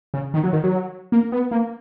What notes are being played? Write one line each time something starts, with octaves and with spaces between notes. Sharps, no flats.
C#3
D#3
F#3
D#3
F#3
A#3
B3
A#3